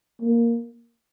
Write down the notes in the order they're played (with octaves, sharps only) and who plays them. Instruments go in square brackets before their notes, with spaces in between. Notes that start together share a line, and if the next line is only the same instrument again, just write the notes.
[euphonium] A#3